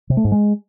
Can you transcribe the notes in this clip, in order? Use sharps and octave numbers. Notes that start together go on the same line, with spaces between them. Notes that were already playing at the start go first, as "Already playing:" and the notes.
C3
A3
G#2
G#3